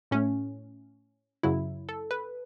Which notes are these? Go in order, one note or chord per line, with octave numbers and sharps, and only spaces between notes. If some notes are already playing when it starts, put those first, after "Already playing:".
A2 A3 C#4
F#2 C#3 F#3 E4
A4
B4